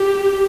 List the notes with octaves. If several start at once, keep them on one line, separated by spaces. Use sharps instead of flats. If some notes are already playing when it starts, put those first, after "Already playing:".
Already playing: G4